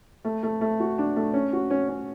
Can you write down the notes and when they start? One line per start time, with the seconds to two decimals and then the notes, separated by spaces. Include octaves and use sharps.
0.25 A3
0.43 A3
0.61 A3
0.80 F#4
0.98 D4
1.16 A3
1.34 C#4
1.53 F#4
1.70 C#4
1.89 C#4